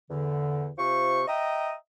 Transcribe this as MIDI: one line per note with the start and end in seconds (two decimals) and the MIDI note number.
0.10 0.69 40
0.10 0.69 50
0.78 1.23 48
0.78 1.23 65
0.78 1.23 72
0.78 1.23 85
1.28 1.73 75
1.28 1.73 76
1.28 1.73 79
1.28 1.73 82
1.28 1.73 87